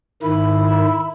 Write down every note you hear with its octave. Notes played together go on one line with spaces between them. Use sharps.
G#2 D#3 E4 B5